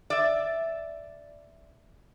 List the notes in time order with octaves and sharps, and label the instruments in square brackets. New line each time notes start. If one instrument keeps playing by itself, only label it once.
[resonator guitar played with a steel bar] D5 E5